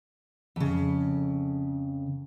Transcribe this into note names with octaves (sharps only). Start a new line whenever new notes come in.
F2 C#3